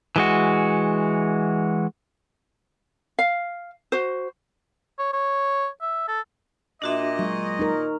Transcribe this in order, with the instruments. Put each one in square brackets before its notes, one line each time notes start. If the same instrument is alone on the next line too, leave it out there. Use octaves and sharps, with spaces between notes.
[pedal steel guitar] E3 G#3 F#4
[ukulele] F5
F#4 C5
[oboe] C#5
C#5
E5
A4
[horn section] A#2 D#5 [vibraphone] D4 F#4 E5
[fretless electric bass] F#3 G#3 [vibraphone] C#6
[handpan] D#4 A#4